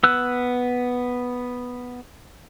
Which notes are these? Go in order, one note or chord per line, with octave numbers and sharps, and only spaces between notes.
B3 E6 F#6